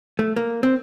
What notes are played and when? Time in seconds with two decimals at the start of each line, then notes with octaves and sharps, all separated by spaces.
0.19 A3
0.36 A#3
0.63 C4